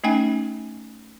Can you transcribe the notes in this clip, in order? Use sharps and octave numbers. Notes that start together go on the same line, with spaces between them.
A3 C#4 D#4 G5 G#5